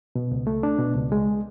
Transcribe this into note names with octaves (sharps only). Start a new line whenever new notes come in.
B2
C#2
A3
D4
B2
C#2
G#3